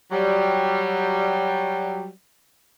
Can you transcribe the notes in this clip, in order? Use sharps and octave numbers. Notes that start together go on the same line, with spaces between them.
F#3 G3